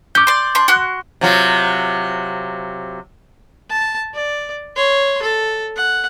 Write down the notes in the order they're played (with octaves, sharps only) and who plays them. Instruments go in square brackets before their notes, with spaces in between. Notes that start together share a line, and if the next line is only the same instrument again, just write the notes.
[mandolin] C#4 [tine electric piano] D6 G6
[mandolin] D5 C6
D4 C6
F#4 C6 F#6
[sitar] C3 F#3 F4
[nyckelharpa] A5
D5
C#5 C6
A4
F#5